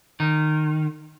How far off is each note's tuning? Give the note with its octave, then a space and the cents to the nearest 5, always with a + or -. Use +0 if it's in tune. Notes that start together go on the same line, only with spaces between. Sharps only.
D#3 -20